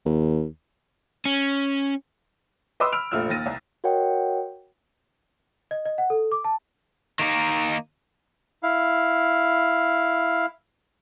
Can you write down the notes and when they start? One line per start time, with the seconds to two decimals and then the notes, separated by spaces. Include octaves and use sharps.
0.05 D#2
1.25 C#4
2.80 B4 D#5 B5 C6 D6 E6
2.92 B5 E6 F6 D7 F7
3.11 F1 A#1 A3 F4 E6 F6
3.30 D#2 A6 A#6 D#7
3.46 C2
3.84 F#4 A#4 C#5 D#5 F#5 G5
5.71 D#5
5.85 D#5
5.98 F#5
6.10 A4
6.32 D6
6.44 A5
7.19 D#3 A#3 D#4
8.63 E4 F5